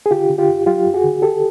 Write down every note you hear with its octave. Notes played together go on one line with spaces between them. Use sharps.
G#4
D3 F4 G4
D3
F4 G4
F#2
F#3 F4 G4
F#2
F#4 G#4
D3
D3 G4 A4